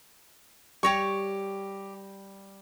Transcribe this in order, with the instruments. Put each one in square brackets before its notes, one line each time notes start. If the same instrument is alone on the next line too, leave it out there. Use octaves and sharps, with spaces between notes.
[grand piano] G3 A#6 [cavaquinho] G4 C#5 C#6